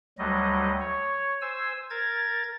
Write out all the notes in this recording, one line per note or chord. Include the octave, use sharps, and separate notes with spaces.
D2 F#3 G3 D#5
C#5
C5 G#5 E6
A#4 G#6 A6